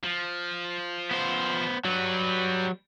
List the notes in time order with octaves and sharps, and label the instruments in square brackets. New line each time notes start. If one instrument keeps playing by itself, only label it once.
[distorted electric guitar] F3
[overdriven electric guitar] B3 C5
[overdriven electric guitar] F#3 [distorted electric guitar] G3 B4